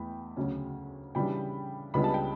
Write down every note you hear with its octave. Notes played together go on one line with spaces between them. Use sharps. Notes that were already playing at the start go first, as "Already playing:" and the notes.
Already playing: E2 A3 G5 B5
D2 C#3 F#3 C#4
C#3 E3 G3 D4 G5 B5
C#2 C#3 G3 B3 D4 B5
A5
G5